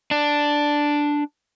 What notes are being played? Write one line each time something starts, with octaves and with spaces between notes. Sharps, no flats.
D4